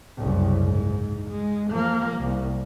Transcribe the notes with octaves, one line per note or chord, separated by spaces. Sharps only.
F#1 C2
G#2
G#3
F3 A#3
C2